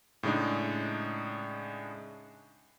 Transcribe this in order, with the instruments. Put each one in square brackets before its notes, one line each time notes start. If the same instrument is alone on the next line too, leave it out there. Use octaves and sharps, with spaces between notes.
[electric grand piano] A2 C#3 G#3 D4 D#4